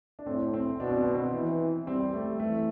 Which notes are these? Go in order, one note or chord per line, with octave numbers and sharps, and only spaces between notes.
D4
A2 C4
C4
B2 D4
C4
B3
C4
E3
G3 C4
A3
E3 A3